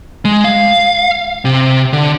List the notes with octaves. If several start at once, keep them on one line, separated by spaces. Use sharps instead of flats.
G#3
F5
C3
D3